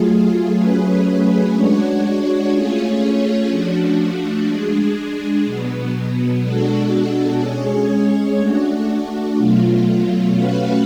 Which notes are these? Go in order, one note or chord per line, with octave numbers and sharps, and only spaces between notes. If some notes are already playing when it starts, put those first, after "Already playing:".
Already playing: F#3 A3 F4 G#4
F#3 A3 C#4 G#4 B4
G#3 D4 F#4 C#5
A3 C#4 F4 G#4 C#5
F3 A3 D4 F#4
G#3 D4 G#4
B2 F#3 B3
B2 G#3 D4 F#4 A4
G#3 C#4 G#4 C#5
A3 D4 F#4
B2 F#3 A3 F4
A3 C#4 F#4 B4 F5